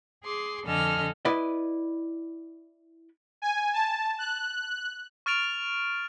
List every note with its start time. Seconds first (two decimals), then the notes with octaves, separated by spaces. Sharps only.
0.24 G#4 C6 D6
0.65 F2 D3 A4 D#5 G#5 F6
1.25 E4 B4 D5 D#5
3.42 G#5
3.73 A5
4.18 F#6
5.26 C#6 F6 A6 D7 F7